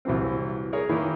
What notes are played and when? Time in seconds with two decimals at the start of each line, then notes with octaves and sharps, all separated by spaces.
0.05 C2 E3 F#3 C4
0.73 G#4 A#4 C#5
0.89 D#3 E3 A#3 E4 A#4